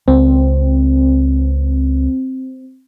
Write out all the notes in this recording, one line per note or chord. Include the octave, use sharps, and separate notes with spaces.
C#2 C4